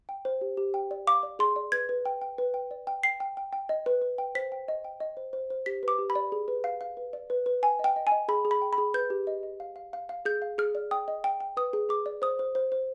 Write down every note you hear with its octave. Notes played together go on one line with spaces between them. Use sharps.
G5
C5
G4
G4
G5
D5
F5 D6
D5
G#4 C6
D5
B4 G#6
B4
G5
G5
B4
G5
D5
G5
G5 C7
G5
G5
G5
D#5
B4
B4
G5
C5 B6
G5
D#5
G5
D#5
C5
C5
C5
G4 B6
B4 D6
G4
B5
D5
G#4
B4
F5
F5
B4
D5
B4
B4
G5 G#5
D#5
G5
D#5
G#5
D#5
G#4 B5
G#4
B5
G5
B5
G#4
B4 G6
G4
D#5
D#5
F5
F5
F5
F5
G#4 G6
F5
G#4 F6
D5
G5 D#6
D#5
G5
G5
B4 D#6
G#4
G#4 D6
D5
C5 D#6
C5
C5
C5